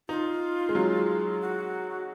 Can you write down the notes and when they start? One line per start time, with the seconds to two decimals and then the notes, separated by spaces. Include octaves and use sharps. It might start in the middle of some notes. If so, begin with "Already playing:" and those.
0.09 D#4 F4
0.69 G#3
0.75 F#3
1.41 F#4